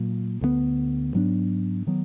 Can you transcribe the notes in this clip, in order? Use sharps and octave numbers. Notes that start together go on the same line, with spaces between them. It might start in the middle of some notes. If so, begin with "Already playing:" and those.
Already playing: A#2 F#3 A#3
D2 D3 G#3 B3
G#2 F#3 B3 D4
D#3 F#3 B3